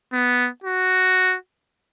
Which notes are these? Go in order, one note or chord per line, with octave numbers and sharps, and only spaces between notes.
B3
F#4